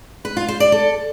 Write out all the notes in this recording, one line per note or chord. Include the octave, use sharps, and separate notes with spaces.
B4
F4
C5
D5
A4